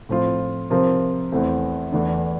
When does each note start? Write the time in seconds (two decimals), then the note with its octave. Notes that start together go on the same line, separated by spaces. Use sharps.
0.09 A2 F3 C4 F4
0.70 C3 F3 C4 F4 A#4
1.32 E2 E3 A3 C4
1.92 E2 E3 A3 D4